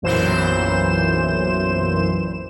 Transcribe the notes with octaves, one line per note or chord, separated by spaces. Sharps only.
B1 F#2 A#2 E3 C5 E7